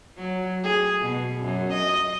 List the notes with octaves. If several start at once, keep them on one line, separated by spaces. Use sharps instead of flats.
F#3
G#4
B2
F#2
D#5